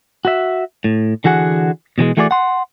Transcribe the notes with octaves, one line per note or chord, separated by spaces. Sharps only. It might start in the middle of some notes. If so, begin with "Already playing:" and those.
F#4 E5
A2
D3 E3 F#4 G#4 F#5
B2 E3 F3 G#3
E3 A3 F#4 G#4 C5 D5
F#5 C6